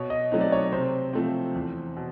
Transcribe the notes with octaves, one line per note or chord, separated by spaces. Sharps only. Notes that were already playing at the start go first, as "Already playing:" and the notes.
Already playing: B2 C#5
D#5
F#3 A3 C4 D#4
D5
C#5
C3 C5
F3 A3 C4
E2
B2